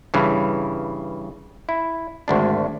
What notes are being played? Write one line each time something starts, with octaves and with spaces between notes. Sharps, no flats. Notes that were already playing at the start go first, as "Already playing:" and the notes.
G2 C#3 E3
E4
G#1 D2 D4